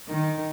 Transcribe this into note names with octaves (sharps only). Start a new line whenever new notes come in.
D#3